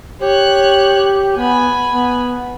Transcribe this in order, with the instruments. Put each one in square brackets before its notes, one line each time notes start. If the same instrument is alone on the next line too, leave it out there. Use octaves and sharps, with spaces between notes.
[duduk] G4 [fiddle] C#5 F#6
[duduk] B3 [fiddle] G#5 B5
[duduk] B3